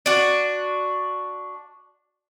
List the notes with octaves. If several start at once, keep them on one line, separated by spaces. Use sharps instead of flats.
D4 F#4